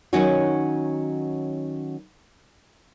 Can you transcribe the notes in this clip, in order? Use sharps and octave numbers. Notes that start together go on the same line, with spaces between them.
D#3 F#3 C#4 D#4 F#4 C#5